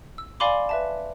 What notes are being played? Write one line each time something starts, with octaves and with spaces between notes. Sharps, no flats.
E6
D5 F5 G#5 B5 C6 D6
B4 E5 A5